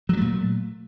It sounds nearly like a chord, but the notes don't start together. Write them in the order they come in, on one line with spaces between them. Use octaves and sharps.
F#3 G3 A3 A#2